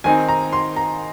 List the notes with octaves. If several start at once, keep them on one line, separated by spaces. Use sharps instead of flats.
D#3 C4 D#4 G#5
A#5
C6
A#5